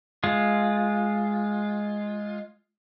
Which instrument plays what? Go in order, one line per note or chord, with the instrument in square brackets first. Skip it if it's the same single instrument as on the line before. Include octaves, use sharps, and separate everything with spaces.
[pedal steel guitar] G#3 F4